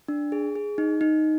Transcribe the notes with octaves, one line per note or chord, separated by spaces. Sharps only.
D4
G#4
G#4
D#4
D#4